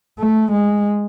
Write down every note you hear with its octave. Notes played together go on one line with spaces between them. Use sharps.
A3
G#3